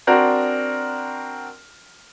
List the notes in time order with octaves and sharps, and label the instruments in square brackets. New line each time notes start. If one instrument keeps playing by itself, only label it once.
[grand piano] C4 D4 F#4 A#4